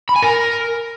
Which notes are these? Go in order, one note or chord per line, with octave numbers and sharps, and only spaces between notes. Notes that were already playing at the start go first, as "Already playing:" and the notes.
B5
G#5
A#4